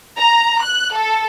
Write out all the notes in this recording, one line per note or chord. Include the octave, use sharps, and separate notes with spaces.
A#5
F#6
A4